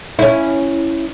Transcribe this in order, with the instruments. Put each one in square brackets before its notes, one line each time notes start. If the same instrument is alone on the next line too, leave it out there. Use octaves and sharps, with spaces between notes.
[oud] C#4 E4